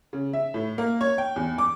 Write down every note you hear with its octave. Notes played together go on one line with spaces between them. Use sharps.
C#3
E5
A2
A#3
C#5
G5
E2
D6